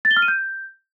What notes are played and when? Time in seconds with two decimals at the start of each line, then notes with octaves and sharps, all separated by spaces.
0.05 A6
0.11 G7
0.17 F6
0.22 D#7
0.28 G6